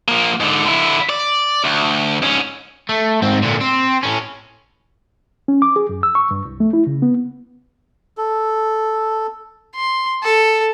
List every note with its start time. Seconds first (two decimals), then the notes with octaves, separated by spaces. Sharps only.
0.08 F3 A#3
0.40 G#2 D3
0.66 D3 E4
1.09 D5
1.65 D2
2.23 G#2 C#4
2.89 A3
3.22 G#2 C4
3.42 A#2 D3
3.60 C4
4.03 A2 C#4
5.48 C#4
5.62 D6
5.76 G#4
5.89 F#2
6.03 E6
6.15 C#6
6.31 G2
6.45 C2
6.60 A3
6.73 E4
6.87 C#3
7.02 B3
8.18 A4
9.75 C6
10.23 A4